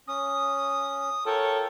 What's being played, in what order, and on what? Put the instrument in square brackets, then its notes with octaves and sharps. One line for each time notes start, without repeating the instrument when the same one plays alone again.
[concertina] C#4 [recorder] D#6
[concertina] F4 A#4 G5 [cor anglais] A4 [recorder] C#5